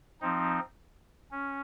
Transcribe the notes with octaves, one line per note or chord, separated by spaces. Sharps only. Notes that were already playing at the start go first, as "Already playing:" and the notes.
F3 C4 D#4
C#4